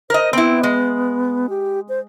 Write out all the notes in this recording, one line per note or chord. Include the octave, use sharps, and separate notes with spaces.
A#4 C5 D#5
B3 C4 E4
G#3
G4
C5